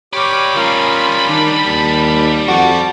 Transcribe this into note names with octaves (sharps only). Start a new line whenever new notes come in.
G4 C#5 D5 F5 B5 D6
G3 C#4 F4 G#4 A#4
D#3 D4 D5
D#2 A5
F2 F#4 A5 D6